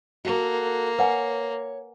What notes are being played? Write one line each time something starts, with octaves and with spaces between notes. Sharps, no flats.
A#3 F#4 A4
B4 C#5 F#5 G#5